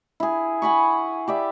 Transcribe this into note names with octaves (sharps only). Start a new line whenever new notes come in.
E4 G#4
F#5 G#5 B5 C#6
G4 D5 E5